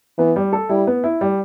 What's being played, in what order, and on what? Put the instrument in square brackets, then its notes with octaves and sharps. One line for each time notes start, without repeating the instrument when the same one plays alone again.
[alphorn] E3 [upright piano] B3
[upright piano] G3
A4
[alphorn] G3 [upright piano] E4
[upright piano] B3
E4
G3